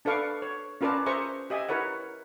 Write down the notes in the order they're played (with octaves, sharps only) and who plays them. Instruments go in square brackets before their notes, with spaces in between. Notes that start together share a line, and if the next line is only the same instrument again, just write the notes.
[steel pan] D4 A4 B4 F5 C#6 D6
C#5
C#4 F4 A#4 B4 D5 A5
G#4 C5 E5 A#5 C#6
G4 D#5 E5 G#5
E4 A#4 B4 C#5 F#5